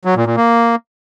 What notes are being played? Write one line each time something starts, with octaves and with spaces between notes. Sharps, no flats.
F#3
A#2
A#2
A#3